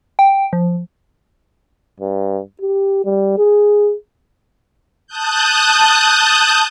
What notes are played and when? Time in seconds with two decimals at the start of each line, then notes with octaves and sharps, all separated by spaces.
0.19 G5
0.53 F3
2.00 G2
2.61 G4
3.05 G3
3.38 G#4
5.07 A5 D#6 F#6 G6